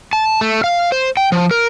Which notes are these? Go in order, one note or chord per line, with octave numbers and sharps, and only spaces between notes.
A5
A3
F5
C5
G5
F3
A#4